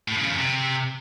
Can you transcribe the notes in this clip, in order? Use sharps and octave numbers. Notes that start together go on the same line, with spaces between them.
A2
C#3
F2
C3